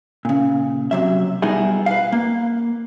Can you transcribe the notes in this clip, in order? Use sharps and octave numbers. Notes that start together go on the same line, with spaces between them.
A#2 C#3
C3 F#3 E5
B2 G3 B3 D#4 E4 G#4
B4 F5
A#3